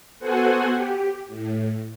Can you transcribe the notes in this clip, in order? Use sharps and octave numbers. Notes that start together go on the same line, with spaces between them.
B3 F#4 A4 C5 F#5 G#5
G4
A2